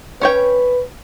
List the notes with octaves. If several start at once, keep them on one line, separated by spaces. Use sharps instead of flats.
C#4 B4 C#5 G5